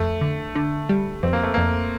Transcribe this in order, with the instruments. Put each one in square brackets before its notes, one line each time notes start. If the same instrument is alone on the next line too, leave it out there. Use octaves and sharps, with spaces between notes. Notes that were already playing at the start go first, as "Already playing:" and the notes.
Already playing: [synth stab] F2 [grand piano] A3
[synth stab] D3
D3
G3
[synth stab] F2 [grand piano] C4
[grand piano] A#3
A3
[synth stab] F2 [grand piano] A#3